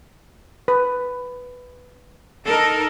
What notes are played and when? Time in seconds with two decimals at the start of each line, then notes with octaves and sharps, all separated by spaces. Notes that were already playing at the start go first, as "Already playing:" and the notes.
0.68 B4
2.46 D#4 A4 A#4